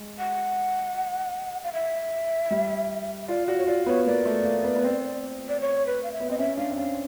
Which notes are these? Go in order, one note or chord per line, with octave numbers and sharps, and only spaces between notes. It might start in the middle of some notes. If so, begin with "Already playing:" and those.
Already playing: G#3
F#5
F5
E5
G3
F4 D5
F#4 D5
C#5
F4 D5
B3 C#5
A#3 D5
A3
A#3
B3
B3
C4
D5
C#5
B4
F5
E5
B3
C4 D#5
C#4 E5
D4 F5
C4
C#4 F5